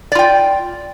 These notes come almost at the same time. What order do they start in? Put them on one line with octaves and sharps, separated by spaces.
D5 F4 G5